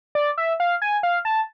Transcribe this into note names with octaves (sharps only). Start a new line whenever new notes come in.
D5
E5
F5
G#5
F5
A5